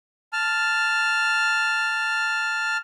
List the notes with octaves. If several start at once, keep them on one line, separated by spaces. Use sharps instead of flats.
A5 F6